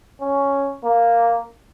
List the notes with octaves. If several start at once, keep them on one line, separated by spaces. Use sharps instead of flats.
C#4
A#3